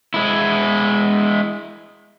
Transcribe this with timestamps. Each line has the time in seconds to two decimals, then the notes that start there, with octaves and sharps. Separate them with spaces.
0.14 G#3 E4